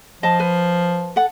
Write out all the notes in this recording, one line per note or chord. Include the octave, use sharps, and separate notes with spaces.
F3 D#5 A5
B4
A4 F#5